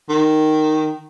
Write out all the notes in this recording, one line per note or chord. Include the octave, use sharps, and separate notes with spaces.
D#3